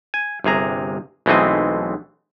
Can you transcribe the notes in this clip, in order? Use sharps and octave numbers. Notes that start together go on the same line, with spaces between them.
G#5
G1 C3 G#4 A#5
B1 E3 G#3 A3 C4 D#5